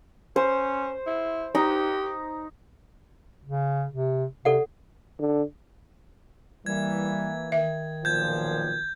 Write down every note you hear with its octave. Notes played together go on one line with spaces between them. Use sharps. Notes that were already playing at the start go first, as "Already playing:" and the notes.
C#4 C5
E4
D#4 G4
C#3
C3
C3 A4 D5 F#5
D3
E3 G3 A#3 G#6
D#3 E5
B1 A#2 F3 G6 G#6